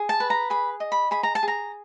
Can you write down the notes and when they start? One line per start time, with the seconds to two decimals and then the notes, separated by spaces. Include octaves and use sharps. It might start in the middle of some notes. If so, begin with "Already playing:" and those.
Already playing: G#4
0.09 A5
0.20 B4
0.30 A#5
0.50 G#4 B5
0.80 D#5
0.92 B5
1.11 G#4 B5
1.23 A#5
1.35 A5
1.43 G#4 A#5